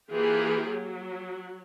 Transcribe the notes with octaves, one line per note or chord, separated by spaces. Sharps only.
E3 A#3 F4 G4 G#4
F#3